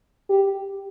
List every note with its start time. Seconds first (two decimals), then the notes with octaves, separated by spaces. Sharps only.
0.30 G4